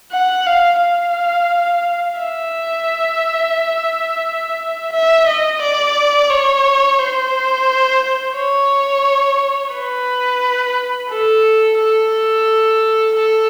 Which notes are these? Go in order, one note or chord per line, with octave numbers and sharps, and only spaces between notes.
F#5
F5
F5
E5
E5
D#5
D5
C#5
C5
C#5
B4
A4
A4
A4